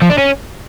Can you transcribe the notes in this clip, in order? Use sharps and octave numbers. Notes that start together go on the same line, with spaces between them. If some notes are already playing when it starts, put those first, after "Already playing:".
F3
D4
C#4